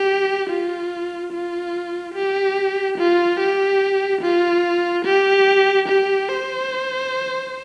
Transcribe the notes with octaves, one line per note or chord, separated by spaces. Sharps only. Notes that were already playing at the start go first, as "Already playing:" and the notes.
Already playing: G4
F4
F4
G4
F4
G4
F4
G4
G4
C5